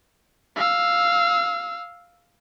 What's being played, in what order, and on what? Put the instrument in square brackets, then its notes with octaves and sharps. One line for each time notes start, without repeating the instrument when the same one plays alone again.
[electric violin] F5 E6